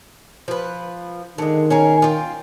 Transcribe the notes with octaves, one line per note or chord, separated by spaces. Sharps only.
F3 B4
D3 D#3 G#3
C#4 G#4 A#4
F4 G5